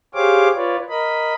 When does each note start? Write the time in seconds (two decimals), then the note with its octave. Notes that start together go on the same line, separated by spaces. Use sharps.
0.15 G4 G#4 C5 C#5 F5 D6
0.55 F4 B4 C#5 D5
0.89 A#4 D#5 B5